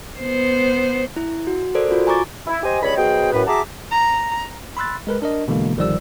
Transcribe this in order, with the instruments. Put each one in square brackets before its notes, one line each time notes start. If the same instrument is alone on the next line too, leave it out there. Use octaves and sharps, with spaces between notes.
[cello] B3 C5
[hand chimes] E4
F#4
A4 A#4 C5 D5
F4 F#4
G#5 A#5 C#6 D6 A6
[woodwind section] E4
G4 C5 D#5 G#5
C#2 G2 C#5 D#5 B5
B2 F#3 G#4 C5 D#5 G5
F#2 A2 B4
F#4 G#4 E5 A5 A#5 D6
[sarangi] A#5
[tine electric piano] B5 C6 E6 F#6 A6
G#3 A#4 B4
D4 A#4 D#5
B2 D3 E3 G#3 A#3
G1 D#3 F3 G3 D5 E6